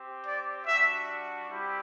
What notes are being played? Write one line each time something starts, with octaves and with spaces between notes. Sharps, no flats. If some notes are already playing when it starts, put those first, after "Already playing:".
Already playing: C4 G4
D5
G3 D4 F#4 E5
G3 C4 E4 G4